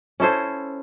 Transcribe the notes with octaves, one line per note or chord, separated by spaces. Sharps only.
C#4 E4 A4 C5